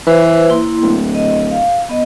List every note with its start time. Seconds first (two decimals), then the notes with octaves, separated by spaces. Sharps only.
0.07 E3 B4 C5
0.49 A#3 E4 C6
0.83 D1
1.15 D#5
1.51 F5
1.89 B3 D#5